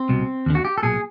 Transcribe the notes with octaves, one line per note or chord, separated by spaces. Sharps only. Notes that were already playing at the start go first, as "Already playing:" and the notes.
Already playing: C4
C2 B2
D#2 D3
F#4
G4
A4
B1 A#2 G#4